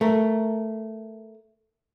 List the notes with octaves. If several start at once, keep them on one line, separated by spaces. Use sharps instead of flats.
A3 A#4